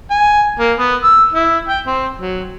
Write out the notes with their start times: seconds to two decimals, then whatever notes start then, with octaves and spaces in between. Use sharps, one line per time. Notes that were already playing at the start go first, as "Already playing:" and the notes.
0.10 G#5
0.59 A#3
0.78 B3
1.03 E6
1.32 E4
1.68 G5
1.86 C4
2.18 F#3